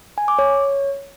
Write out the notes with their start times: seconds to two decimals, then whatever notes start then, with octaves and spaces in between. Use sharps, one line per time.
0.18 G#5
0.28 D6
0.39 C#5